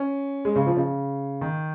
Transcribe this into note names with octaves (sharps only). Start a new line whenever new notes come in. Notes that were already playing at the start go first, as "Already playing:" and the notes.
Already playing: C#4
G#3
C#3
F3
C#3
D#3